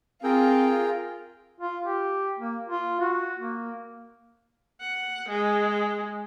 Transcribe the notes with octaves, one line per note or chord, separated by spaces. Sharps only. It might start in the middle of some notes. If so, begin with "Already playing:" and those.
C4 F4 G#4 A#4 G5
F4
G4
A#3
F4
F#4
A#3
F#5
G#3